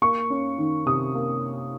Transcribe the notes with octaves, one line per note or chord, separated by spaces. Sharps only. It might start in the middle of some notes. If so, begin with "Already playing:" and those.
A#3 C#6
C#4
D#3
C3 D#6
A#3